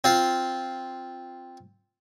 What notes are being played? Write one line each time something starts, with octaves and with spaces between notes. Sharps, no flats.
C4 F4